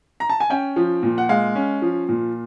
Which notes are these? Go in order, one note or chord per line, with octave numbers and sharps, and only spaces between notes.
A#5
A5
G#5
C#4 G5
F3
A#2
F#5
G#3 F5
C#4
F3
A#2